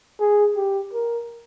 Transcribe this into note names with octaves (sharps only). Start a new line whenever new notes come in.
G#4
G4
A#4